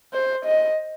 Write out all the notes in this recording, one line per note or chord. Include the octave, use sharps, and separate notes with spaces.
C5
D#5